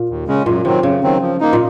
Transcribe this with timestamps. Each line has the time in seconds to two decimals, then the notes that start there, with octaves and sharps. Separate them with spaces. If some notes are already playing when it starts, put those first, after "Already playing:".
Already playing: A#2
0.09 D#2
0.27 C#3 G#3 C#4
0.46 F#2 A#2
0.65 C3 D#3 F#3 C4
0.83 F#2 C#3
1.03 D#3 F#3 C4
1.22 F3
1.40 A#3 D#4
1.53 A#2